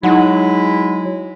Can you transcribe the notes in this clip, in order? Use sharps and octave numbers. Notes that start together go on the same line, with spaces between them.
F#3 G#3 D#4 E4 F#5